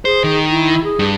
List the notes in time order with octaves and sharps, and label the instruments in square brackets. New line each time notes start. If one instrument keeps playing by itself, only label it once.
[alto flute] G#4 [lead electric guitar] C5
[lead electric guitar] D#3
[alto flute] E4
G#4
[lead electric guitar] G2